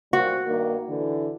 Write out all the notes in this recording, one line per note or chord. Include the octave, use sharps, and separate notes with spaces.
G3 A#3 C4 F#4
G2 D#3 A#3
D3 E3